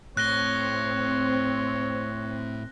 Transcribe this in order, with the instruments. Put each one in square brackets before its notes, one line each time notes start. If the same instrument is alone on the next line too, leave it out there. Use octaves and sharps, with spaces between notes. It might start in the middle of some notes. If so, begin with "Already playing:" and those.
[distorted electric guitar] A2 [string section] C4 [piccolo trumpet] C#5 [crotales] F#6 A#6 G7